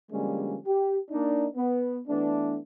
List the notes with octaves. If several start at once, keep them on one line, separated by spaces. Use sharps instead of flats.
D3 F3 G3 G#3 A#3 C#4
G4
A#3 D4 D#4
B3
E3 A3 B3 D4